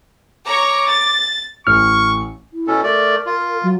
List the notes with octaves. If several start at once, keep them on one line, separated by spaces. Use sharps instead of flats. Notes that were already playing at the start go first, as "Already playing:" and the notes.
C#5 A#5 C#6 D6
A6
A1 A2 C#6 F6
E4
B2 C#4 A4
A3 A#4 D5
F4
F#3